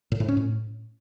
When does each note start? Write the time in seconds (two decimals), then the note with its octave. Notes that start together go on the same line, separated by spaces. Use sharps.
0.12 A2
0.20 G#2
0.28 C#4
0.37 A2